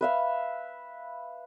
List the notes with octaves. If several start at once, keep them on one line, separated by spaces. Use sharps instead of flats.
B4 E5 F5